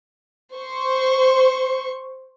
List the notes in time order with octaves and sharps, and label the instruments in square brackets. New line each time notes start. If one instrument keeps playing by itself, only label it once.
[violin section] C5 C#6